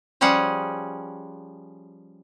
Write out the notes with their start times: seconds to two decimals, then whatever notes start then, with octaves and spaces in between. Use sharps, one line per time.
0.21 F3 G3 C#4 G#4 F#5